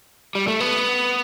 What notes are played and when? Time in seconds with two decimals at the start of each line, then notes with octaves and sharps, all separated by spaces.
0.35 G3
0.48 A3
0.60 B3